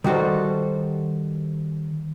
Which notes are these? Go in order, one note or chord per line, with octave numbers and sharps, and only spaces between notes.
D#3 G3 F#4 A4 C5